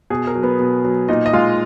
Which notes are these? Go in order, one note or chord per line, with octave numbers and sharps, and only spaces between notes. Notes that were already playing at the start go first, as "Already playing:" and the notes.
B2 G#4
A#4
F#3
B3 B4
B2
F#3
A#2 D#4 D#5
D#5
G#3 F4 F5